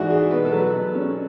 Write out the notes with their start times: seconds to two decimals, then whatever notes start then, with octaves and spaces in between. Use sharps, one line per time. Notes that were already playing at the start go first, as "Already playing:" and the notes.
Already playing: G#2 E3 G#3 F#4 D5 E5
0.10 G#3 G#4
0.31 B2 B4
0.45 A4
0.52 F#3
0.57 B4
0.74 B2
0.95 C#4